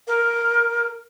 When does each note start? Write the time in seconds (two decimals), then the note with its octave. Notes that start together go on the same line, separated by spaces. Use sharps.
0.08 A#4